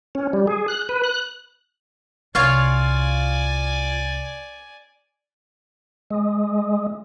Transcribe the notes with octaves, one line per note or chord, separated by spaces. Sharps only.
C#4
G3
G#4
F#6
B4
F#6
C2 F4 C#5 D5 F5 G#5
G#3